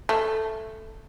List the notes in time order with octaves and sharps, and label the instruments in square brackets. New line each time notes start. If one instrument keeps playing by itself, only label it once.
[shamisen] A3